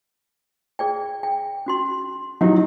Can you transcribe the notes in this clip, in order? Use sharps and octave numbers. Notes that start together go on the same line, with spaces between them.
G#4 D5 G5
G5
C#4 F#4 C6
F#3 D#4 E4 G4 F#5